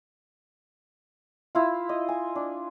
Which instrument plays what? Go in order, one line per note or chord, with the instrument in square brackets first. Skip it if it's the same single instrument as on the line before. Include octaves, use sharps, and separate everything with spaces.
[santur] E4 F4
D#5
G#5
D4